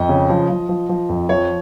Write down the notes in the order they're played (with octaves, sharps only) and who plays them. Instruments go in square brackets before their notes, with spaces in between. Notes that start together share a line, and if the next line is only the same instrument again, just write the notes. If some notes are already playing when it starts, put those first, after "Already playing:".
Already playing: [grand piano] F2 [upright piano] D#5
[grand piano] C#3
F3
F3
F3
F3
F2
[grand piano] F3 [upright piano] C#5